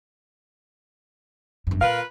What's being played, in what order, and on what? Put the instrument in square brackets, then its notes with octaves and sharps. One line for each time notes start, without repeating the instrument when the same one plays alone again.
[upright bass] G1 F#2
[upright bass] A#2 [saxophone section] F4 A#4 B4 [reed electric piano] F5